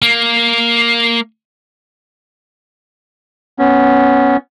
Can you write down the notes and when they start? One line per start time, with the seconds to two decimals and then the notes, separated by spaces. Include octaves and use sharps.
0.02 A#3
3.59 B3 C#4